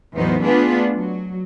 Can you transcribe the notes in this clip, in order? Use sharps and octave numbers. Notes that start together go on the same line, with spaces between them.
E2 A2 F#3 B3 D#4 C5
A3 B3 D4 F4 G#4 B4
F#3